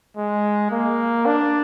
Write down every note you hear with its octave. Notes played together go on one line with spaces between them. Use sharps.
G#3
A#3
D4